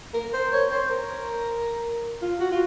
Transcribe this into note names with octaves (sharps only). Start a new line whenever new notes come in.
A#4
C5
C#5
C5
A#4
F4
F#4
F4